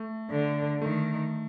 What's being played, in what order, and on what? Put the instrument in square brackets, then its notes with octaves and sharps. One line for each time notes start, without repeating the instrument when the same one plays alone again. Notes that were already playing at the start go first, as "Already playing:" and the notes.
Already playing: [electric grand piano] A3
[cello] D3
[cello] D#3 [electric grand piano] A3